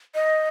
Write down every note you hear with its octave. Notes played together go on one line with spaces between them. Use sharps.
D#5